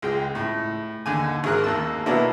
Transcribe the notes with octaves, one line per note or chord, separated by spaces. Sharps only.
C#2 G#3 G5
A2
D#2 D3 G#5
G#1 G#4 A#4 F#6
D#2 A#3 A5 E6
B2 F#3 A#3 B3 D4 E4